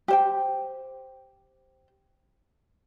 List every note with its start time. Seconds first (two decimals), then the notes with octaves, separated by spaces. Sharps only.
0.08 G4 C5 G5